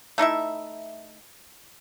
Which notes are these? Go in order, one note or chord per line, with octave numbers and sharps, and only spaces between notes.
A3 D#4 E4 E5